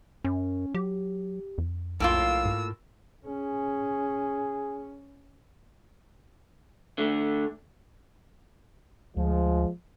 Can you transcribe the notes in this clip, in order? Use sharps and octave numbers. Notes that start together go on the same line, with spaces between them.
F#2 C#4
F#3 G4
F2
B1 A2 A#3 F4 E6
G#2
C#4 G#4
D3 A3
D2 F3 G#3